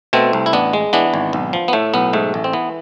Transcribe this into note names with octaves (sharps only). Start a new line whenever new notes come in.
B2 A3 C4
C2
E4
A1 B3 D4
G#3
E3 B3 D4
G#1
B1
F3
B3
A2 A3
B1 B3
G#2 A3
A1
C4
E3 B3